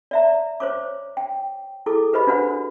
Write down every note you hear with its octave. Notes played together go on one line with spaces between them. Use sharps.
D5 E5 A#5
C5 C#5 D6
G5
E4 G#4 A4 D6
G4 B4 C5 D#5 B5
D4 F#4 B4 C5 F#5